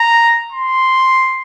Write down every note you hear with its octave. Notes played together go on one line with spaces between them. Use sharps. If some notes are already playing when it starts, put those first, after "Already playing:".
Already playing: A#5
C6